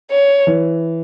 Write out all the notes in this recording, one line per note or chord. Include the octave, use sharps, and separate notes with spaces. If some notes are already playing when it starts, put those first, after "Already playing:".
C#5
E3